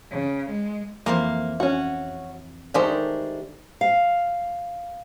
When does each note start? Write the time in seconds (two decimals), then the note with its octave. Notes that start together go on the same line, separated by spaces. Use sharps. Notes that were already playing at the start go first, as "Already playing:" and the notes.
0.11 C#3
0.50 G#3
1.06 F2 E3 A#3 C5
1.60 C#4 F#4
2.74 D#3 G#3 A3 D4 G4 C5
3.81 F5